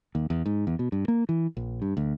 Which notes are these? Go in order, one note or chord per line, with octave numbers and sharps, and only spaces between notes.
D#2
E2
G#2
E2
B2
G2
A#3
E3
A#1
G2
D2